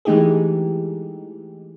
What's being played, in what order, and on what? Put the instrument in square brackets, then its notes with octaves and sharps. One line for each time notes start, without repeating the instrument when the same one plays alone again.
[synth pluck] E3 G#3 A3 D#4 G4 G#4